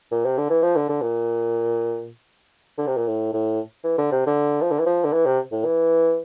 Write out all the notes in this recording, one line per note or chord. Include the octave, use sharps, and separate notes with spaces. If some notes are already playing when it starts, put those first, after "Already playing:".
A#2
C3
D3
E3
F3
D3
D3
A#2
D3
C3
A#2
A2
A2
E3
D3
C3
D3
F3
D3
E3
F3
D3
E3
C3
A2
E3